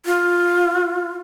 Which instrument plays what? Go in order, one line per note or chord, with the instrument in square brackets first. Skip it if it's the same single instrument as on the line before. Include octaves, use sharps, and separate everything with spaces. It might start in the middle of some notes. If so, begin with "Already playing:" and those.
[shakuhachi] F4